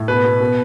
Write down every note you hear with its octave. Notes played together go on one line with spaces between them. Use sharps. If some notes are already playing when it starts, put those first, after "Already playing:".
Already playing: A2
B2 B4
B2
B2